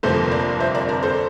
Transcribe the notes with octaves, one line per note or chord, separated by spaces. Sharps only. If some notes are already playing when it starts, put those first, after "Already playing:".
G1 F2 C3 F3 A#3 A4 C5
A#4 D5
C5 E5
A#4 D5
A#4 D5
A4 C5